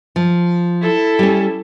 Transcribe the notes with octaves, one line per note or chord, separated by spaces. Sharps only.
F3
E4 A4
G3 C#4